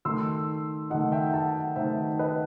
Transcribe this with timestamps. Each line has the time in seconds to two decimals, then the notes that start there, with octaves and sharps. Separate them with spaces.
0.05 D#3 A3 D#4 C6 E6
0.90 D#3 A3 D#4 D#5 F#5
1.12 E5 G5
1.33 F#5 A5
1.76 D#3 A3 D#4 C5 E5
2.19 B4 D#5